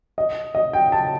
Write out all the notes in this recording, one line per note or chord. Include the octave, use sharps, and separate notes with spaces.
D#5
D#5
G5
A5